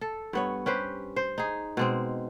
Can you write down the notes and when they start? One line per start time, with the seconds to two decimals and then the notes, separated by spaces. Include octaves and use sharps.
0.01 A4
0.33 G2 B3 C#5
0.66 C#4 G4 B4 C5
1.16 C5
1.38 D#4 G#4
1.77 B2 G#3 C4